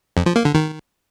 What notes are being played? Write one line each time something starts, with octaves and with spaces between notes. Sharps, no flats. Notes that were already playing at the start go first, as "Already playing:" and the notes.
F2
F3
A#3
D3
D#3